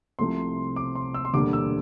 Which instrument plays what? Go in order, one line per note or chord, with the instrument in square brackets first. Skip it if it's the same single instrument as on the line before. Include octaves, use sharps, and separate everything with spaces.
[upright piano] C2 C3 F3 A3 C6
D6
C6
E6
C6
E1 D2 D3 G3 A#3 D6
E6